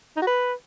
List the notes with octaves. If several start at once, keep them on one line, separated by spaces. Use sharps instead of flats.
D#4
F#4
B4